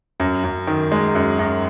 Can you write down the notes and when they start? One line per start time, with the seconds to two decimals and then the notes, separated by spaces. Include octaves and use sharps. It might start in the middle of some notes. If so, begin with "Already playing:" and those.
0.20 F#2
0.44 F#2
0.67 D#3
0.92 G#3
1.15 F#2
1.39 F#2